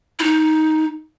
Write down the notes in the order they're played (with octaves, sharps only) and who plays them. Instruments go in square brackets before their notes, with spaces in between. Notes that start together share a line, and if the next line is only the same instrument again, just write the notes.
[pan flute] E4
D#4